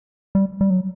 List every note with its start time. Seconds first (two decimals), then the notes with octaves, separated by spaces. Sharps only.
0.35 G3
0.61 G3
0.70 F#3